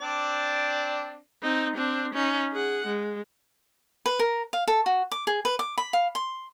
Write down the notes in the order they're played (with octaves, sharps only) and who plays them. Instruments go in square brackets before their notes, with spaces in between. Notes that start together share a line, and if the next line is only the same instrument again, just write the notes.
[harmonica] C4 D4 D5
[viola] C4 D#4
C4 D4
C#4 D#4
G#4 F#5
G#3
[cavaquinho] B4
A#4
F5
A4
F#4
D6
G#4
B4
D6
B5
F5
C6